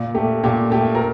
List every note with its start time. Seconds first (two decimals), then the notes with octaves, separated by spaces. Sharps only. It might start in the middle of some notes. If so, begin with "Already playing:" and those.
Already playing: A#2
0.15 A3 G4
0.43 A#2 G4
0.71 A3 G4
0.95 A#4